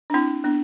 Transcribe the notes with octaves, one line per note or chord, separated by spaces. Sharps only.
D4
C4 E4
B3 D4